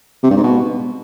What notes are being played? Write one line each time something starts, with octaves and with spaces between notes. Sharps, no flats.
C3
G2
G#2
B2